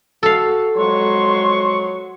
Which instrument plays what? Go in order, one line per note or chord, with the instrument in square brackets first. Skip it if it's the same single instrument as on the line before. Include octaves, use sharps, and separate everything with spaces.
[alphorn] F#4 [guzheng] A4 F5
[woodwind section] F2 G#3 C#6 [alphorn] F#3 [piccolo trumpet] C6